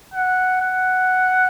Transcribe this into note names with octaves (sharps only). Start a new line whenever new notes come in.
F#5
F#5